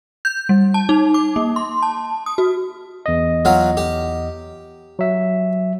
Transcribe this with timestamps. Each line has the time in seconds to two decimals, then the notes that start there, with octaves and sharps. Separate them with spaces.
0.25 G6
0.49 G3
0.74 A5
0.89 D#4
1.14 D6
1.36 A#3
1.56 C6
1.82 A5
2.26 D#6
2.38 F#4
3.06 E2 D#5
3.45 F#3 F4 F#5
3.77 G4
4.99 F#3 E5